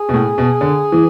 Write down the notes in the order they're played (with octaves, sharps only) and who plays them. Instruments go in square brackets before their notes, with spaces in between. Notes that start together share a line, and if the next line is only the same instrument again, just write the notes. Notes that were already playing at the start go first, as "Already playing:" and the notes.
Already playing: [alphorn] G#4
[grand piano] B2
A2
B2
D3
E3